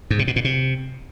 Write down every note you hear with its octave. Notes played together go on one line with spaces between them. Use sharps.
G#2
C3
B2
A#2
C3